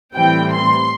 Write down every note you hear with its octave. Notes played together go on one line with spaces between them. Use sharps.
A2 E3 G3 C4 G5
C6